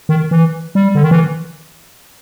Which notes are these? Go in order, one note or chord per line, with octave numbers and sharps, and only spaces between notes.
D#3
E3
G3
D3
D#3
E3